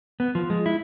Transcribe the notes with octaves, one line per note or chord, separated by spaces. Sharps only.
B3
F3
G#3
E4